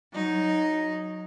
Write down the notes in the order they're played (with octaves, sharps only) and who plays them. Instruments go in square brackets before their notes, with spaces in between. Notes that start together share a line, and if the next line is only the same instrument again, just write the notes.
[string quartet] F#3 D#4